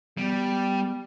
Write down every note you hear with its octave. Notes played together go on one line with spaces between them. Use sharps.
G3 B3